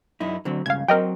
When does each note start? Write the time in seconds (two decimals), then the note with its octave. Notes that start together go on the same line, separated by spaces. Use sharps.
0.20 F#2 D#4 E4
0.45 D3 F#3 C4
0.66 C#2 G2 C#3 F5 G#6
0.88 F#3 C4 A#4 D#5 G5